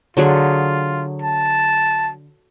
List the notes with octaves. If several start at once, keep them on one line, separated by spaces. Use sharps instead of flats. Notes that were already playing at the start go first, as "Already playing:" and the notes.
D3 F#3 F4 G#4
A5